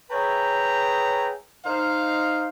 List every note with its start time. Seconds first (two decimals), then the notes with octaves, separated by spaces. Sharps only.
0.10 G#4 B4 C#5 E5 G5 A#5
1.65 D#4 C5 F5